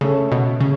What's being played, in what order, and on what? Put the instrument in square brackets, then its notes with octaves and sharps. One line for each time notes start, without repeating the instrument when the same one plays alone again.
[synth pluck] C#3 [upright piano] A3 C#4 A4
[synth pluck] B2
C#3